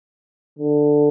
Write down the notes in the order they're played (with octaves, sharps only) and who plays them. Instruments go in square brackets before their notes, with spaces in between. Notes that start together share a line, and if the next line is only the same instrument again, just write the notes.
[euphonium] D3